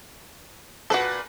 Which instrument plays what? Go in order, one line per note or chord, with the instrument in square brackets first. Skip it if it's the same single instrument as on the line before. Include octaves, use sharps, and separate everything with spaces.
[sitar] A#2 B4 [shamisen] F#4 A4